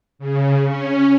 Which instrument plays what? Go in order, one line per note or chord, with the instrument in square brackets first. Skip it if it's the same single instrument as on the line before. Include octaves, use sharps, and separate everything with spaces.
[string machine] C#3
C#4